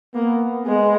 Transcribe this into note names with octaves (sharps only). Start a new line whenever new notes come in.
A#3 B3
G#3 B3